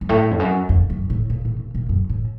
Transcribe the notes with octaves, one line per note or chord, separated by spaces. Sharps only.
F#2
A2
F2
F#2
F2
F#2
A2
A#2
A2
A#2
A#2
F#2
A2